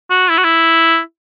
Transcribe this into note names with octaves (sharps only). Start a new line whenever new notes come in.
F#4
E4
F#4
E4